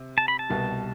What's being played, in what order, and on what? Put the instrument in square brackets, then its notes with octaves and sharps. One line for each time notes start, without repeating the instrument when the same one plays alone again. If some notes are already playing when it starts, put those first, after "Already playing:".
Already playing: [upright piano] C3
[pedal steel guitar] A5
B5
A5
[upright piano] C2 B2 G3